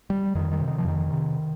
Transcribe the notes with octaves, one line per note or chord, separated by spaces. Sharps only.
G3
F2 D#3
D#3
C3
D#3
F3
F2 D#3
C3